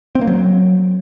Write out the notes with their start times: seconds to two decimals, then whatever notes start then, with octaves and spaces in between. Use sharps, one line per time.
0.15 C4
0.21 A#3
0.27 F#3